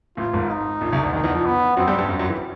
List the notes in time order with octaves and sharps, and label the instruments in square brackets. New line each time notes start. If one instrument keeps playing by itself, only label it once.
[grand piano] A1 A2 [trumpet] F4
[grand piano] G#1 G#2
[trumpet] D#4
[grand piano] A#1 A#2
C2 C3
D2 D3
[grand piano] D#2 D#3 [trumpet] D#4
[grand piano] E2 E3
F2 F3
[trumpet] B3
[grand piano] F#2 F#3 [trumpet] C4
[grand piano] G2 G3
G2 G3
F#2 F#3
F#2 F#3
E3